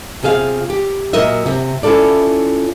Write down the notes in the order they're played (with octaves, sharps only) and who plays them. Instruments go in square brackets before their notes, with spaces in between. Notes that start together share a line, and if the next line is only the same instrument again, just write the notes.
[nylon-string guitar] C3 F4 G#4 E5 F5
G4
A#2 F#3 A#4 D#5 E5
C3
C#4 E4 F4 A4 D5